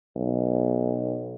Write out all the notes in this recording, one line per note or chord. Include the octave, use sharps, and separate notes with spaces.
B1